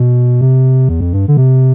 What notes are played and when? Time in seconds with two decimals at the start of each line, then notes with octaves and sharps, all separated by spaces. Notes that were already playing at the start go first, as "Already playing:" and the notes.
Already playing: B2
0.41 C3
0.89 E2
1.00 F2
1.13 G2
1.28 D3
1.37 C3